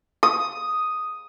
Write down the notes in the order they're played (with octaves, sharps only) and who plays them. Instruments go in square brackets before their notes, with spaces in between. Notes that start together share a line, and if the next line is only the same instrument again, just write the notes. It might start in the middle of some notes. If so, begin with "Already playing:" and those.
[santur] D#6